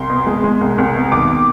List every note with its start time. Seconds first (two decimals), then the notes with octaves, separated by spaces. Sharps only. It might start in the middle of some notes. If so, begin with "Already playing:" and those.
Already playing: C2 C6
0.10 B2
0.27 G#3
0.44 G#3
0.61 C2
0.78 C2
0.95 B2
1.12 D#2 D6